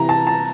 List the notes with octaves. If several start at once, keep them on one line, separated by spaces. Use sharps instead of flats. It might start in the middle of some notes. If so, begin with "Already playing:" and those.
Already playing: C3 E3 A#5
A5
A5